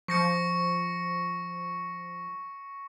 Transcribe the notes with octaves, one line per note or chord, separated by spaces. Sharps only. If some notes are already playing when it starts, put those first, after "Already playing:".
F3 C#6 A#6 C#7